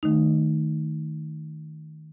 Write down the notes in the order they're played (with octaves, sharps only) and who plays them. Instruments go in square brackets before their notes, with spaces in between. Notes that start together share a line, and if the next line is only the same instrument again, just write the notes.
[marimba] D#3 A3 D#4